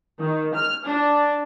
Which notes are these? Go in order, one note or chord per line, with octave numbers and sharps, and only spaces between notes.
D#3
F6
D4